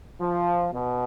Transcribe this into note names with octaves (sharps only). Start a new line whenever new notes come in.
F3
B2